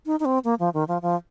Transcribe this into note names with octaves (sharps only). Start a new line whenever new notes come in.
D#4
D#4
C4
A#3
F3
D#3
F3
F3